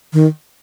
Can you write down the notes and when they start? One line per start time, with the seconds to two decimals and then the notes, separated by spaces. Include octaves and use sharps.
0.13 D#3